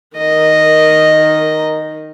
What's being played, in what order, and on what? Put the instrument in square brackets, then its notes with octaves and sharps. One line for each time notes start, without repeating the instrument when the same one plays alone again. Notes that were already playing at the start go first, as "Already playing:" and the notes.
[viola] D#3 [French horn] A#4 [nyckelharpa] D#5